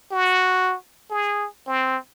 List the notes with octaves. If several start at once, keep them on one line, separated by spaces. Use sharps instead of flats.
F#4
G#4
C4